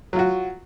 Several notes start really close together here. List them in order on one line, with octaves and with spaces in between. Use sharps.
F#3 F4 F#4